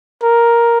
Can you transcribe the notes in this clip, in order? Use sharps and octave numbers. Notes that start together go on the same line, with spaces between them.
A#4